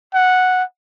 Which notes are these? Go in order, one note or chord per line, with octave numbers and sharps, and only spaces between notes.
F#5